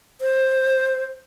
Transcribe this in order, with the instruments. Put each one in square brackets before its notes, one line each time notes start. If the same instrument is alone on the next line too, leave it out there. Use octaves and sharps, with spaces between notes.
[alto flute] C5